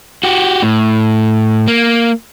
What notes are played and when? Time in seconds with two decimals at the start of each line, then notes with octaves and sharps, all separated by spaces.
0.23 F#4 G4
0.62 A2
1.68 A#3